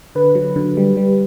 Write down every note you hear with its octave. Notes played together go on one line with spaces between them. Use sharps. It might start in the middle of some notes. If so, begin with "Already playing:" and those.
D3 B4
F#3
D3
G3
G3